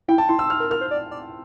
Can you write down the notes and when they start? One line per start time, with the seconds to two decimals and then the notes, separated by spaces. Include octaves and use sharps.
0.08 E4 G5
0.18 A5
0.29 E4 C6
0.39 E6
0.50 F6
0.60 A#4
0.70 A#4 F6
0.81 C5
0.91 D5
1.11 D5